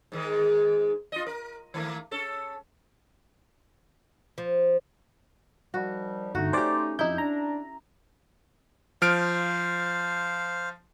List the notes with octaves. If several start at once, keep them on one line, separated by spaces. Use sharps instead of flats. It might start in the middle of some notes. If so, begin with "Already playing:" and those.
G#2 D#3 G#3
F4 D#5
A#4
D#3 A3 A#3
C#4 A4
F3
D#3 F3 G3 F#4
G1 D2 A3 D#4 F#4
C#4 G4 C5 D5
F2 D#4 E4 G6
D4 A#5
F3 C5 F5 F6 D7